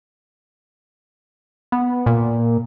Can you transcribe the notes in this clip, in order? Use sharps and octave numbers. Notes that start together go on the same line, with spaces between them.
B3
A#2